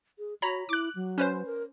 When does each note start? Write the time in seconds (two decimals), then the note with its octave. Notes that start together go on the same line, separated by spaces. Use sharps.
0.19 G#4
0.42 F#4 C#5 A#5 B5
0.69 E4 D6 F#6
0.95 F#3
1.18 C#4 B4 C5
1.46 A#4